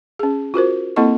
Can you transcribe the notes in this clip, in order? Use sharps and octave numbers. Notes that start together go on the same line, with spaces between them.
C#4 G#4
F4 F#4 A#4 C5
A#3 C4 E4 A4 D#5 C#6